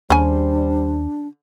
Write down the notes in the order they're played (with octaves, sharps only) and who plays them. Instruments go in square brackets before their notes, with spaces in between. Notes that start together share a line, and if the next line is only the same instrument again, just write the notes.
[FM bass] D#2 [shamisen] C#3 G#5 [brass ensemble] G3 C5 [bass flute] D4